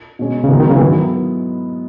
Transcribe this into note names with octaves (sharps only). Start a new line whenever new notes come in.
B2 G#3 C#4
C#3
G#2 D#3 F#3 B3 D#4
D#3
C#3
E3
D#3 F#3 B3 E4 A4